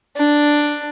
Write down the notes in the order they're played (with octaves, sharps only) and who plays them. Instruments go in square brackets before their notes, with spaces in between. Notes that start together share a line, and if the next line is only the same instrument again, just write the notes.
[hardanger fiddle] D4